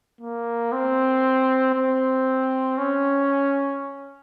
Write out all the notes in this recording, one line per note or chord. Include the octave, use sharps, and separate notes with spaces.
A#3
C4
C4
C#4